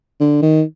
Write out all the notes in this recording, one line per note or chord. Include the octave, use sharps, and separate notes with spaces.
D3
D#3